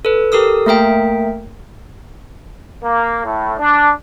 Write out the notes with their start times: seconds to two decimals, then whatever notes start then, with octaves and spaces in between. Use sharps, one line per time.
0.05 A4 B4
0.32 G4 A4 A#4 D#6 E6
0.66 A3 A#3 A#4 E5 G5
2.83 A#3
3.24 A2
3.58 D4